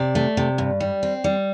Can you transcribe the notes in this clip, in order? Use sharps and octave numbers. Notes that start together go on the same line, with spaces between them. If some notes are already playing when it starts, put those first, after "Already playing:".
Already playing: C3 D5
A3
C3
G2
G3
C4
G3